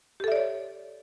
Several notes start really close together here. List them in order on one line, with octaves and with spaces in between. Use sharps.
G4 A4 E5 D5 C#5